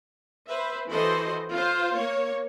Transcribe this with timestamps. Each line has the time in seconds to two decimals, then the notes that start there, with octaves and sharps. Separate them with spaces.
0.49 B4 C5 E5
0.89 E3 F#4 A4 C5 D#5 C6
1.52 F4 C5
1.96 A#3 C#5